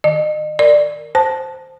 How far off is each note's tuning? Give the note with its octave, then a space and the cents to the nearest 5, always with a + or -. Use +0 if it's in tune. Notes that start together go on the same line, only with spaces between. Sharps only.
D#3 +0 D#5 -35
A#4 -15 D5 +10
C5 +0 A5 +0